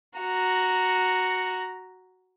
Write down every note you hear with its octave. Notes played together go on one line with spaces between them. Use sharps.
F#4 A#5